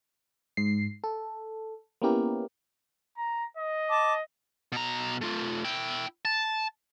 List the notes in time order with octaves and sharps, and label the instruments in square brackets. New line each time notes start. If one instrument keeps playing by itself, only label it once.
[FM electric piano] G#2 C7
A4
A#3 B3 C#4 E4 G4 A#4
[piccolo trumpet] A#5
D#5
[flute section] A5 D6
[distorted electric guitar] B2 A#5
A3 F4
E4 G5
A5